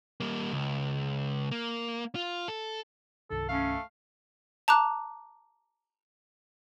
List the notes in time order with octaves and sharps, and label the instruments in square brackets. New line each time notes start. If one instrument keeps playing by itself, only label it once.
[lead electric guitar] G3 A#3
C#2
A#3
F4
A4
[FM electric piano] C2 G2 D#3 [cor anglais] A4
[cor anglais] A3 [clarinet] C#4 [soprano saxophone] F5
[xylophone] A5 A#5 D6 F#6